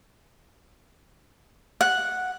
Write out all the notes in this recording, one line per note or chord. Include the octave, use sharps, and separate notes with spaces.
F#5